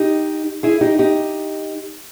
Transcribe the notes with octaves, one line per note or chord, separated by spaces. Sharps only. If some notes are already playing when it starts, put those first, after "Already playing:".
Already playing: D#4 G4
E4 G#4
D#4 G4
D#4 G4